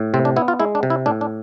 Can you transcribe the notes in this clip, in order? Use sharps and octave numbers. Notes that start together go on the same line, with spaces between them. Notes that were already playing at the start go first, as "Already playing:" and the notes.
Already playing: A2
C3 C4
D4
B3 E4
F4
G#3 E4
D4
C3
E4
A2 D4
D4